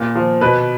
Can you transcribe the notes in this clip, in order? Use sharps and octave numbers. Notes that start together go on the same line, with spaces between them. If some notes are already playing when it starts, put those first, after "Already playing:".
Already playing: A#2
F3
B2 B4